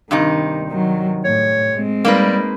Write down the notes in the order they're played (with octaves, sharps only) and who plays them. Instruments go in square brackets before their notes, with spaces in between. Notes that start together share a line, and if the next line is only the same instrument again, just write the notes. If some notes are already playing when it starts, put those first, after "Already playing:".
[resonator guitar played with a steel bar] G2 C3 D#4 [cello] D#3
[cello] D#3 F#3
[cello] A2 [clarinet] C#5
[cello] G#3 C4
[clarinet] G3 [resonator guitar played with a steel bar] A#3 D#4 B4